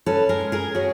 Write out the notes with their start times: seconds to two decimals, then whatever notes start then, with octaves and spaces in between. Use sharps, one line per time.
0.06 C#4 A4 B4
0.29 G#4 A#4
0.41 G#3
0.52 G#4 A#4
0.75 C#4 F#4 G#4